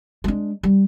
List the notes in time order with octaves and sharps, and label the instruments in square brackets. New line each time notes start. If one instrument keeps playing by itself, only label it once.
[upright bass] G#3 D4
G3